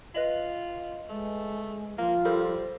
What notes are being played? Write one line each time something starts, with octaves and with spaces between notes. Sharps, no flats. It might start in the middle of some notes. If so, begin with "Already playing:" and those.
F4 B4 D#5 F#7
G#3 A3
F3 A#3 F4
G3 A4 A#4 C5